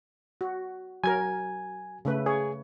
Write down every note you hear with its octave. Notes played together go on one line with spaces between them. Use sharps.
F#4
F#3 A#4 G#5 G#6
C#3 A3 B4
G#4 C#5